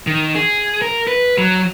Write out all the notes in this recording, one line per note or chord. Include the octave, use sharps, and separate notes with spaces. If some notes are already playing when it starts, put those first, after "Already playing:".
D#3
G#4
A#4
B4
F#3